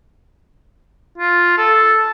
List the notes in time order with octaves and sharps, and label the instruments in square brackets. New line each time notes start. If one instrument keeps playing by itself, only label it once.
[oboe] F4
A4